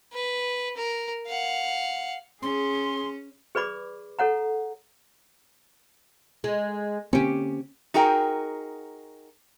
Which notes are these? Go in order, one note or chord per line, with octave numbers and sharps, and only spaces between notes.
B4
A#4
F5 F#5
C#4 G#4 C6
G#4 B4 D5 B5 D6
A4 C#5 F#5 A#5
G#3
D3 A#3 C4 C#4 G4
D#4 F#4 G#4 A#4 G5